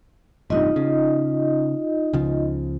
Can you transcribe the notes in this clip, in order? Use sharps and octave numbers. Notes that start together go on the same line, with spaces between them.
A1 G2 C3 D#4 F4 D#5
C#3
C#2 C#3 F3